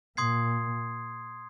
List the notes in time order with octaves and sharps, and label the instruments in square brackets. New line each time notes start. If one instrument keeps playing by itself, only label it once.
[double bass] A#2 [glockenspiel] C6 D#6 G#6 C7